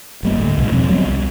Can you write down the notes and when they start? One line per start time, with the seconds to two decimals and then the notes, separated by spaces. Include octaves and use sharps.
0.23 G1 G3 A#3
0.37 D2 A2
0.57 C2 A#2 G#3
0.72 E2 B2 F3 C4
0.90 F#3 G3 B3 C#4
1.06 C2